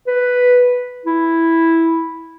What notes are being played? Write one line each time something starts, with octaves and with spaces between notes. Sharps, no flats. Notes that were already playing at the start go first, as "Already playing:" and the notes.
B4
E4